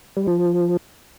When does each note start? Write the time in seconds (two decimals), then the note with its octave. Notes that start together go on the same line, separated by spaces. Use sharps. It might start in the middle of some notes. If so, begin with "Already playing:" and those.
0.17 G3
0.27 F3